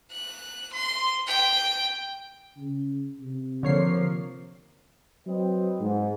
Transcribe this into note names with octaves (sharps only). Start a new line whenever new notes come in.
F#6
C6
G5
C#3
C3
D3 F3 A#3 C#5 C7
F#3 C4 B4 D#5
G#2